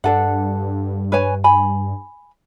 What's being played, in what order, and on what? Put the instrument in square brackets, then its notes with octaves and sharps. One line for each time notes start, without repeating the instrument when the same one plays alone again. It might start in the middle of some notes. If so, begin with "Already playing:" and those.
[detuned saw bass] G2 [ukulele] D4 A4 F#5
[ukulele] B4 C#5 G#5
G#5 B5